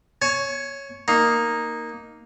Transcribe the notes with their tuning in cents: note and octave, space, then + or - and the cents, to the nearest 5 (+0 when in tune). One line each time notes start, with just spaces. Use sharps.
C#5 +0 G#5 +40
A#3 +0 D#4 +0